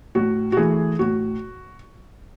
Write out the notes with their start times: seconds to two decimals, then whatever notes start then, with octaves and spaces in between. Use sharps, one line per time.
0.15 A2 F#4
0.52 F#4
0.57 E3 A3 G#4
0.99 A2 F#4